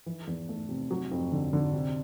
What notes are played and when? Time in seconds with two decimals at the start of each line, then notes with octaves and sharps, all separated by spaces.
0.06 E3
0.27 E2
0.49 A3
0.69 C3
0.91 F#3
1.11 F2
1.32 D3
1.53 D3
1.73 C3